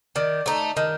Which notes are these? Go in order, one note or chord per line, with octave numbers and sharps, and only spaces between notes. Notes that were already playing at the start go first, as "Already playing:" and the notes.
D#3 D5
A3 D#4
D#3 D#5